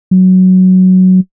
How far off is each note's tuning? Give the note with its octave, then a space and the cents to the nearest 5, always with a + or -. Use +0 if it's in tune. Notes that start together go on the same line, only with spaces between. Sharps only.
F#3 +5